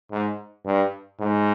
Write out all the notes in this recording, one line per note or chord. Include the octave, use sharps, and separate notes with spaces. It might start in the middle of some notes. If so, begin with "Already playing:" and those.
G#2
G2
G#2